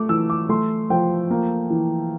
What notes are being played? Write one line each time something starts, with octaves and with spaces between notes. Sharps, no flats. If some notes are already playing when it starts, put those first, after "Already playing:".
Already playing: A3 D6
E3 E6
D6
A3 C6
F3 G5
A#3
E3